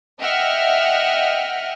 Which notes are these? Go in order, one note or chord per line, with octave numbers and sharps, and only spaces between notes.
D#5 E5 F#5 G5 F6